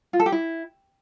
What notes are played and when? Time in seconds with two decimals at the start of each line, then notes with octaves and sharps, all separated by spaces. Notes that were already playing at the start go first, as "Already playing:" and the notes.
0.13 F4
0.20 A4
0.26 G4
0.32 E4